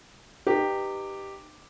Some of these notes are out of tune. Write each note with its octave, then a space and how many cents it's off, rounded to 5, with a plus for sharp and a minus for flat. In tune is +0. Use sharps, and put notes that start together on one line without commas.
D#4 -25 G4 +0 B4 +0